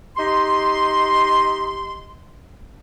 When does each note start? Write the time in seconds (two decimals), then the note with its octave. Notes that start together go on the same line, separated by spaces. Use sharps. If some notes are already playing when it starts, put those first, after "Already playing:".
0.17 D#4 G4 C6